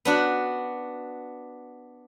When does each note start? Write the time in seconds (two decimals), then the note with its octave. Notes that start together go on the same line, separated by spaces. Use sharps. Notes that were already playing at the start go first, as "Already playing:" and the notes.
0.05 B3 D4 F#4